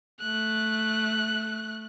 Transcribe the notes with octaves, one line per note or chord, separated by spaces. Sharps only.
A3 F#6